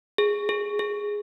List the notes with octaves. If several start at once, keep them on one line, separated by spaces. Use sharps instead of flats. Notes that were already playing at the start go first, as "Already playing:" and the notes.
G#4
G#4
G#4